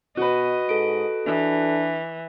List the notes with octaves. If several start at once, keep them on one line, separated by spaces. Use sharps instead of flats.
B2 F#4 B4 D#5
G#2 A4 D7
E3 D4